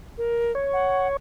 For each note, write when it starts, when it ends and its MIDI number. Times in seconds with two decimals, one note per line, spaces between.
0.18 0.51 70
0.55 1.17 73
0.73 1.07 78